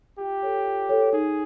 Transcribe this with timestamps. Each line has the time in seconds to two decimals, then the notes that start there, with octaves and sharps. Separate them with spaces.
0.19 F4 G4
0.43 A4 C#5
0.66 F4
0.89 A4 C#5
1.13 D#4 G#4